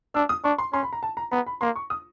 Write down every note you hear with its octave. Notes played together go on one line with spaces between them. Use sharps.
D4 E6
D#6
D4 C#6
C6
C#4 C6
B5
A#5
A5
A#5
B3 A#5
B5
A#3 C6
C#6
D#6